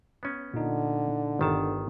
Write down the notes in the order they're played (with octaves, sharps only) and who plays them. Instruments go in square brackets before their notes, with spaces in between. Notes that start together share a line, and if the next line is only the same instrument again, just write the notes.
[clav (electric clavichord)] B3 C#4
[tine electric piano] A#2 D#4 [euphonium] D3
[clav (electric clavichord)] G1 D#3 A5